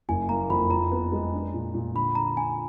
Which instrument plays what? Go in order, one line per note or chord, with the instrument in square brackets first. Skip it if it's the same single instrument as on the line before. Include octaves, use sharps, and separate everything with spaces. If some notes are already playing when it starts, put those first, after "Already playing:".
[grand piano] F#1 [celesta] G#5
[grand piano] A#3 [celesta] A#5
[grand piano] F2 [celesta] B5
[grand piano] F2 [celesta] A#5
[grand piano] B3
G#3
D4
A#2
A#2
[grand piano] D3 [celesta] B5
[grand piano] D3 [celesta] A#5
[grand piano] D3 [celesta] G#5